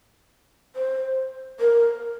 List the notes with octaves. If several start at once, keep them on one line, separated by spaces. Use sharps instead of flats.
C5
A#4